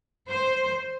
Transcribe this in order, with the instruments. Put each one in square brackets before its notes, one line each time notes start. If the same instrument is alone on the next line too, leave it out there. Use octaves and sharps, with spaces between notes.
[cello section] C5